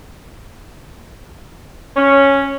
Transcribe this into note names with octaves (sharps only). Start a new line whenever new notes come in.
C#4